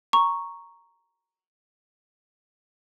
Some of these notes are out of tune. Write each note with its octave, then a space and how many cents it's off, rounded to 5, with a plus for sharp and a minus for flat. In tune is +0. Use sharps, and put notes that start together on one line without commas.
A#5 +0 C#6 +0